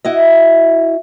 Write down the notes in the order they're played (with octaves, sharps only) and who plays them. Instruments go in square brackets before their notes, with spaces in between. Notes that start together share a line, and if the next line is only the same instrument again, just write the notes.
[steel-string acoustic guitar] E4 F#4 D#5